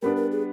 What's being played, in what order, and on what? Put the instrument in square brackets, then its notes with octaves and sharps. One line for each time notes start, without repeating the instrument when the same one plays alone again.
[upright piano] G3 B3 D4 [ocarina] A#4
[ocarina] A#4
G#4